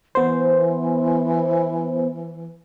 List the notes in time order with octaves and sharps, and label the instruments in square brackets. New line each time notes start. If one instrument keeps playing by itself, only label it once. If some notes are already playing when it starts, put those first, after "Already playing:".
[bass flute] E3 [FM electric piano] B3 C5